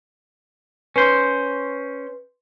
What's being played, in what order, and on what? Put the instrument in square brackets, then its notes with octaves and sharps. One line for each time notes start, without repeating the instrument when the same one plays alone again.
[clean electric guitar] C#4 C5 [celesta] B4 C6